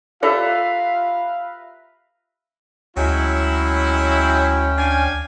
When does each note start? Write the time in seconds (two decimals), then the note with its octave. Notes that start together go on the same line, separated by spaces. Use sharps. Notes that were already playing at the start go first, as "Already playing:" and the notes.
0.23 F4 G4 A4 B4 D5 E5 F5 A#5
2.97 D2 F#3 G#3 C#4 E4 G5
4.78 D4 F5 G#5